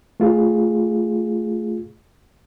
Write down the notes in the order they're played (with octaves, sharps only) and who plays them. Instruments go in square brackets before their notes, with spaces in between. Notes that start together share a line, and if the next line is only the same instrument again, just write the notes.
[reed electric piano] A3 F4 G#4